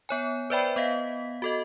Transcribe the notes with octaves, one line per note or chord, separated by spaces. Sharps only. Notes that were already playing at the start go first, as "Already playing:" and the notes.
B3 C#5 G#5
B4 C5 D5 E5 G5 B5
B3 D#5 F5 B6
F#4 A4 D#5